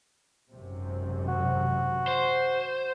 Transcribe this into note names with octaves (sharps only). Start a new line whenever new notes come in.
G#1 F#2 C3
F#4
C5